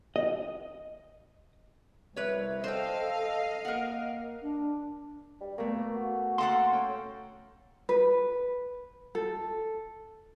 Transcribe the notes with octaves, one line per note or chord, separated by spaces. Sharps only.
D#5
C2 B4 C#5 E5
A4 C5 D#5 F5 G5
A#3 A#4 F#5
D4
G3
B2 A3 A#3
F#4
A#3 A4 F5 F#5 C6
C#4 G5
B4
A4